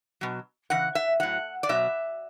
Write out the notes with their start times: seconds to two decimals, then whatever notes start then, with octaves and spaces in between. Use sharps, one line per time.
0.21 B2 F#3
0.70 C#3 E3 F#5
0.95 E5
1.20 A2 F#3 F#5
1.63 D5
1.69 B2 F#3 E5